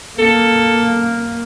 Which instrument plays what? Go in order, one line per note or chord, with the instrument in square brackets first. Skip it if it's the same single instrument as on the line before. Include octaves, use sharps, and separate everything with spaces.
[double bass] A#3 [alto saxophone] A4